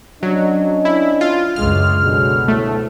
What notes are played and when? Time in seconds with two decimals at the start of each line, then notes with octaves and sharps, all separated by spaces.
0.23 F#3 C#4 D4 D#5
0.85 E4
1.21 F4
1.56 C#2 F#2 G#3 F6
2.02 B2 D3 F#3 G#3
2.48 D2 A2 A3